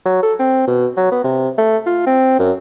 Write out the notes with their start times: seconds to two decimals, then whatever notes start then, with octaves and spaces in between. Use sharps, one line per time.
0.05 F#3
0.23 A4
0.39 C4
0.67 B2
0.97 F#3
1.11 B3
1.24 C3
1.58 A3
1.86 F4
2.06 C4
2.39 F#2